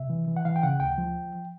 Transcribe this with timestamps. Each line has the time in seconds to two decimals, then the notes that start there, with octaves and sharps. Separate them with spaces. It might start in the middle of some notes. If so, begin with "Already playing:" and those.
Already playing: C3 E5
0.10 E3
0.28 E3
0.37 F#5
0.45 E3 F5
0.56 G5
0.63 C#3 F#5
0.80 D2 G5
0.98 F3